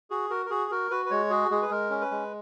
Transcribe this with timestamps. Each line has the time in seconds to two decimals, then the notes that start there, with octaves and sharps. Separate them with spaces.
0.10 F#4 G#4
0.30 F#4 A#4
0.46 A#4
0.50 F#4 G#4
0.71 F#4 A#4
0.91 F#4 B4
1.06 B4
1.11 G#3 C#5
1.30 F#4 G#4
1.51 G#3 G#4
1.62 B4
1.70 G#3 A#4
1.90 C#4
2.01 B4
2.11 G#3